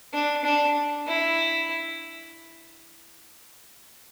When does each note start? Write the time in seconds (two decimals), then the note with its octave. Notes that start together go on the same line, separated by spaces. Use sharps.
0.13 D4
0.45 D4
1.07 E4